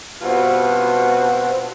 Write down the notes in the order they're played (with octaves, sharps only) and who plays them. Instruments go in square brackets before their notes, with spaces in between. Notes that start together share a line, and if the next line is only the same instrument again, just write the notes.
[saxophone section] G2 B2 C4 F4 F#4